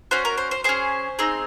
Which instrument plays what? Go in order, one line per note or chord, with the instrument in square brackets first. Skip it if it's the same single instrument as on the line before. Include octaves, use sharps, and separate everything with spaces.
[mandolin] C#4 F#4 C5
A#4
C5
C5
C#4 G#4 C5
C4 D#4 G#4